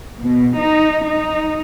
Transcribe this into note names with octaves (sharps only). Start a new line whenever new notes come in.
B2
D#4
D#4